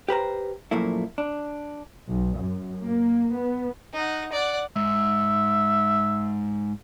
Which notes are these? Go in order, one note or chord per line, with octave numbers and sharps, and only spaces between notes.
G4 B4 C5 A#5
F#2 A#2 F3 A3 A#3 E4
D4
B1
F#2
A#3
B3
D#4 F#5
D5 F#5
G#2 E5